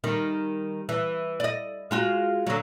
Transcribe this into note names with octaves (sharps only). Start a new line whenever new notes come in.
D#3 G3
E3
D5 D#5
G#3 F4 F#4
D3 F#3